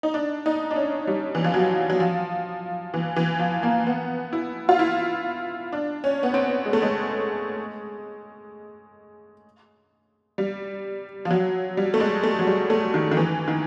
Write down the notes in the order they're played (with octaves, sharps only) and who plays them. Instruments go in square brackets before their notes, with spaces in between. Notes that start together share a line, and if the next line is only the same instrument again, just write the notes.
[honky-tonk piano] D#4
D4
D#4
D4
C#4
G3
E3
F3
F#3
F#3
F3
E3
E3
F3
A#3
B3
E4
F4
E4
D4
C#4
B3
C4
G#3
A3
G#3
G3
F3
F#3
G3
A3
G#3
A3
F#3
G3
A3
D#3
D#3
E3
D#3